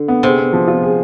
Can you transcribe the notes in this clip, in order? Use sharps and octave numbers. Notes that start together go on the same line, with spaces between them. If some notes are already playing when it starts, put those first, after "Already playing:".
Already playing: D3
B3
C3 G#4
B3
F3
F4
G#4